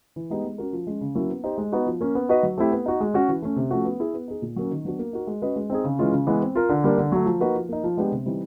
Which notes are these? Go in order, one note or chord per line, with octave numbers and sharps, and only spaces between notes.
E3
G#3 B3 D#4 G4
G#3
C#4 F#4 A#4
F3
G#3 C#4
C#3
F#3 A#3 C#4 E4
B3
D#4 G4 C5
G#3
B3 D#4 F#4
F3
A#3 C#4
B3
D#4 F#4 B4 D#5
F#3
A3 C4 E4 G4
B3
D#4 F#4
G#3
C#4 F#4
E3
A3 C#4
C3
F3 A3 C#4 F#4
B3
E4 G#4
B3
D#4 G#4
A#2
F#3 A#3 C#4
D#3
F#3 B3 D4 F#4
A#3
D#4 F#4 A#4
G#3
C#4 F#4 B4 D#5
G#3
C4 D#4 G#4
C#3
E3 G#3 C#4 F4
C#3
E3 G#3 B3
C4
F4 A#4
D3
G3 A#3 D4
D3
F#3 A3
F3
A#3 D#4 F#4 B4
F3
A#3 D#4
F3
G#3 B3 D4 G4
C3
E3 G3 C4 D#4